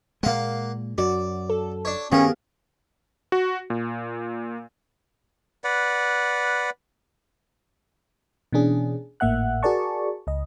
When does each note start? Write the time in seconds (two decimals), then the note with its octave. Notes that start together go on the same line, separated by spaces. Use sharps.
0.23 A#2 G#3 A#3 F5 F#5
0.98 F#2 F#4 D5
1.49 A4
1.85 D4 C#5
2.12 G2 D#3 B3 C#4 G4 G#4 A#4 F5
3.32 F#4
3.70 A#2
5.64 B4 D5 F#5
8.53 B2 E3 C#4 D4 G#4
9.20 G#1 A2 A#3 E5 F#5 F#6
9.63 F#4 G#4 A#4 D5 A5 C#6
10.27 C#2 D#5